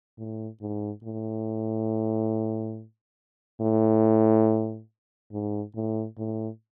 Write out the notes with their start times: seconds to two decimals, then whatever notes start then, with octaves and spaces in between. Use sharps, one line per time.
0.18 A2
0.61 G#2
1.04 A2
3.61 A2
5.32 G#2
5.75 A2
6.18 A2